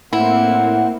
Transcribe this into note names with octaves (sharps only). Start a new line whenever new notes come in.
A2 A#3 C4 E4 F#5